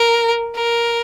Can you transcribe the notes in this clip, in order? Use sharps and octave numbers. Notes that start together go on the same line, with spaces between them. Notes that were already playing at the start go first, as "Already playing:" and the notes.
Already playing: A#4
A#4